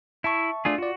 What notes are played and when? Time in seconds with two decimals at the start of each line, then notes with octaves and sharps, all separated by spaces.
0.24 E4 E5 A5 C#6
0.65 A3 D4 F4 G#4 D5
0.78 F4 F#4 D5